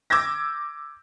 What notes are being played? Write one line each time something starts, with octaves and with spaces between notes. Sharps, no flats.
D6 E6 G6 G#6 A#6